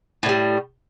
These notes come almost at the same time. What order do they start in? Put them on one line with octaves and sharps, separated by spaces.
A2 D3 G3